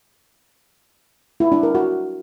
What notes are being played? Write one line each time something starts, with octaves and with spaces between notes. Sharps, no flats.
E4
D4
A#4
F#4